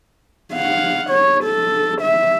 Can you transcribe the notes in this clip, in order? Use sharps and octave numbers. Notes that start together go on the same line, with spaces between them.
F5 F#5
C#5
A4
E5